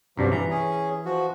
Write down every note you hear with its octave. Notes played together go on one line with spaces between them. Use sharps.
C2 G2 F3 F#3 D5
E3 A#5
C#4 G#4
F3 F#4